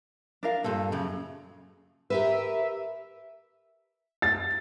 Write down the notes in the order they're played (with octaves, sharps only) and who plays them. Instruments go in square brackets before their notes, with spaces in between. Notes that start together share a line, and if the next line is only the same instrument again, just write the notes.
[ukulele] D4 A#4 F5
[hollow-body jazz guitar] G2 A#2 [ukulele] A4
[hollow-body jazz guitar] F#2 C#3
[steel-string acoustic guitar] G4 A#4 B4 [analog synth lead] E5
[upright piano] A6